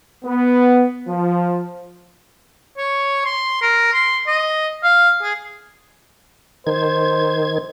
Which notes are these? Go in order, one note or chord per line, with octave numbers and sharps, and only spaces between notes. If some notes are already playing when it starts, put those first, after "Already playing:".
B3
F3
C#5
C6
A#4
C6
D#5
F5
G#4
D#3 C5 G#6